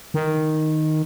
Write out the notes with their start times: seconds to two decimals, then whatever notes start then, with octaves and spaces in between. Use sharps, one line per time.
0.14 D#3